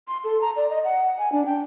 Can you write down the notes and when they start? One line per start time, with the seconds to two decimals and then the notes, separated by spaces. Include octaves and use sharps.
0.08 C6
0.24 A4
0.41 A#5
0.56 D5
0.70 D#5
0.84 F#5
1.18 G#5
1.32 D4
1.46 G5